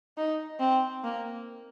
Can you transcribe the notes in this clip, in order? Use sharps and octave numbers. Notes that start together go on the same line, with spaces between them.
D#4
C4
A#3